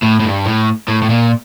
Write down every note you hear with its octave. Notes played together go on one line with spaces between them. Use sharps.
A2
A2
G2
A2
A2
A2
A#2